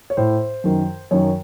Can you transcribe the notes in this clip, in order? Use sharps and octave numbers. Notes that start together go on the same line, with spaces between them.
C#5
A2 C5
F#2 D#3
F#2 D#3 C#5